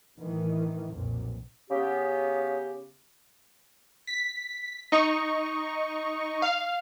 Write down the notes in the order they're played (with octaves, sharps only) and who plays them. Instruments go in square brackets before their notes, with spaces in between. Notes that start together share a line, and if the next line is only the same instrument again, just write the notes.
[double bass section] A2 D#3 E3
B1 F2 A#2
[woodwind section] C#3 B3 G4
[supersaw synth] B6
D#4 C#6
F5